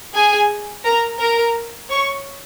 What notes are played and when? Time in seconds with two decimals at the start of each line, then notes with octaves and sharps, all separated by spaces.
0.14 G#4 G#5
0.84 A#4 A#5
1.19 A#4 A#5
1.89 C#5 C#6